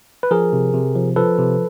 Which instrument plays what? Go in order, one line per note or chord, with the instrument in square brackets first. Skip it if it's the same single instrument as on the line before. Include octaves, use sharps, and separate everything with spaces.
[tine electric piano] B4
F3 G#4 A#4
C3
C3
F3
F3 A4 B4
C3